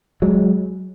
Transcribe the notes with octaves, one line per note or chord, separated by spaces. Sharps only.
F#3 G#3